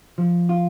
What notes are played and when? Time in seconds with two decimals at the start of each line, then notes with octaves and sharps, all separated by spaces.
0.18 F3
0.49 F4